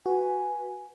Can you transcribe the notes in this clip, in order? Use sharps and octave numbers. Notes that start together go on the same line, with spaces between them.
F#4 B4 G#5